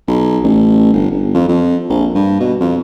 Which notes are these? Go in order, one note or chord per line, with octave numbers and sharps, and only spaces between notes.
B1
A1
G1
G1
F2
F2
A#1
G2
B2
F2